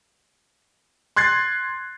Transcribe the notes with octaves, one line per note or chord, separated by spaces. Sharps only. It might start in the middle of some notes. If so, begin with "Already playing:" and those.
C6 F#6 G#6 A6 C7